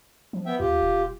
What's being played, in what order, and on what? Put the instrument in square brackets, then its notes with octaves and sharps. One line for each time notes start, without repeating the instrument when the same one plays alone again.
[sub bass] F3
[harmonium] B3 E5 G5
[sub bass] D#2 [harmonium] F4 G4
[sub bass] D#1